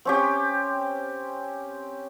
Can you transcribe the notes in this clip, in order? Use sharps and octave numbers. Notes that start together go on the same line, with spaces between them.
C4 C#4 G4